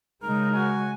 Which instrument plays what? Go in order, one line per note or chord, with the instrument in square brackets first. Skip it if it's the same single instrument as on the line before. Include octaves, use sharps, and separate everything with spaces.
[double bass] C#3 G#3 [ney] D#4 [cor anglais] A#4
[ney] F#4 [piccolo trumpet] G#5